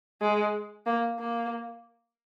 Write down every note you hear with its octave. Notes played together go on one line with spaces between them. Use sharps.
G#3
A#3
A#3